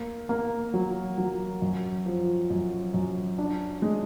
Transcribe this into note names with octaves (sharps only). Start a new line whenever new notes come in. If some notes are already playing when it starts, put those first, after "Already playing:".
Already playing: A#3
A#3
F#3
F#3
F#2
F3
F#2
F#2
D4
G#3